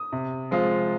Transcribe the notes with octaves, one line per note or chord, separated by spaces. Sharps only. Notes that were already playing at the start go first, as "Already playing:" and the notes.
Already playing: D#6
C3
F3 G#3 C4 F4